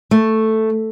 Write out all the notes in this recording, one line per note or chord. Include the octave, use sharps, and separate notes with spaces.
A3